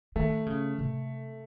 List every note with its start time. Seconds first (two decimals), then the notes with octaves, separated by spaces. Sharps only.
0.16 D#3 A3
0.46 C#3
0.79 C3